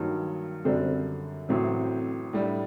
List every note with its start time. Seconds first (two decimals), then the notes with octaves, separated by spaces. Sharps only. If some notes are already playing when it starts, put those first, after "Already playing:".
Already playing: G2 D#3 F#3 A#3 D#4
0.65 F#2 D3 G3 C4 D4
1.49 A1 A2 F#3 C4
2.33 A2 G3 D4